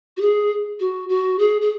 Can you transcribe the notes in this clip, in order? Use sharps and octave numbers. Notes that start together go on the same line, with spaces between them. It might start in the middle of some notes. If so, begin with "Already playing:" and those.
F#4
G#4
F#4
F#4
G#4
G#4